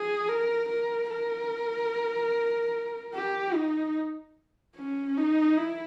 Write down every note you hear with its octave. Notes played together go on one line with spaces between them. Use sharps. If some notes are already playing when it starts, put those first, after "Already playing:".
Already playing: G#4
A#4
A#4
A#4
G4
D#4
C#4
D#4
E4